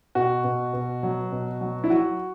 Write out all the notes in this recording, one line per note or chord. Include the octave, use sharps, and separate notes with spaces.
B2 F#4
B2
B2
F#3
B2
F#3
E4
F#3 F#4